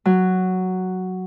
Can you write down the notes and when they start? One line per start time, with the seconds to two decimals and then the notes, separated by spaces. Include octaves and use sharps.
0.05 F#3